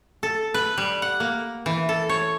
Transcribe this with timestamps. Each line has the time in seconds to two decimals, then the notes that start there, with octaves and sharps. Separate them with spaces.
0.23 A4
0.54 B4
0.78 G3
1.02 F#5
1.20 A#3
1.66 E3
1.89 A4
2.09 C#5